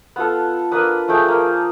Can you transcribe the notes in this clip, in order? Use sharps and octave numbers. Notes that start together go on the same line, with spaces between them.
B3 F4 A4
A#3 D4 B4 D#6
F3 A3 G#4 G5
A#3